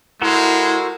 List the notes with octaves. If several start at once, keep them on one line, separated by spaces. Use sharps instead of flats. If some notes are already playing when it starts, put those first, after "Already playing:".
G#3 E4 F#4 A4 A#4 C5